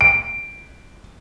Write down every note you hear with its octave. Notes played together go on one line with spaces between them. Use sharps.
D7